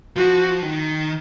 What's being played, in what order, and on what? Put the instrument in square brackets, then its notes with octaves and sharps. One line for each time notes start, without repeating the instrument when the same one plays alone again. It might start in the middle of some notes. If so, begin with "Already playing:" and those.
[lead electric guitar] F3 [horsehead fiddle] F#4
[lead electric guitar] D#3